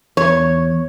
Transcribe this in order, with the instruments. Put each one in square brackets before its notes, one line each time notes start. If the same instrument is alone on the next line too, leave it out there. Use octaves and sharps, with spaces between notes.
[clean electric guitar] E2 [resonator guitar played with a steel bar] C#5